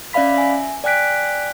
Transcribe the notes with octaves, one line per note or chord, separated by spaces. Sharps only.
C#4 D5 E5 F5 B5 B6
E5 G#5
D5 G5 G#5 F#6 B6 D7